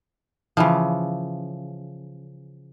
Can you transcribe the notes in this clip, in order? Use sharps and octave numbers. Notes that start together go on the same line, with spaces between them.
C#3 E3 F3